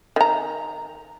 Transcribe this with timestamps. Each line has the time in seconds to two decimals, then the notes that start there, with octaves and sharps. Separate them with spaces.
0.16 D#3 A#5